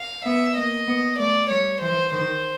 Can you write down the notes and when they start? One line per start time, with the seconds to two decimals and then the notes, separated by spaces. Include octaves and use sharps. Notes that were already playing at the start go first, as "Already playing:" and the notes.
Already playing: F5
0.25 B3 E5
0.56 A#3 D#5
0.87 B3
1.19 A3 D5
1.50 G3 C#5
1.81 E3 C5
2.12 D#3 C5